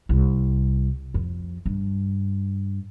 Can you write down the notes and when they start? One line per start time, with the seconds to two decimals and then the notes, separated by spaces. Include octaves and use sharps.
0.09 C2
1.14 F2
1.66 G2